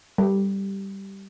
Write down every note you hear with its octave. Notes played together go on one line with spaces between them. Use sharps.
G3